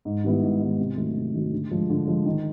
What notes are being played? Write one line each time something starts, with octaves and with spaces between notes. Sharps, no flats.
G#2
D#3 G3 B3 E4
G#2
D#3 G3 B3 E4
C3
D#3 F#3 A3
C3
D#3 F#3 A3
D3
F3 G#3
D3
F3 G#3
D#3